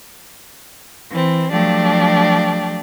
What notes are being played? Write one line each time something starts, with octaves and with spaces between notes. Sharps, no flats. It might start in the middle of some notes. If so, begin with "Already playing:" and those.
E3 C4
F3 F#3 A3 D4 G4